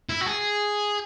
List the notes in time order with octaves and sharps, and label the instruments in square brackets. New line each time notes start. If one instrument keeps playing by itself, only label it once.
[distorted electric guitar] E4
F#4
G#4